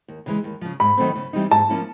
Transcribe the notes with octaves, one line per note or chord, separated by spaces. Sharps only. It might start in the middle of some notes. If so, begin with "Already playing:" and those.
D#2
C#3 E3 G#3
D#2
C#3 F3
G#2 B5
D#3 F#3 A3 C4
C#3
E3 G3 C4 D#4
G#2 A5
F3 A#3 C#4 E4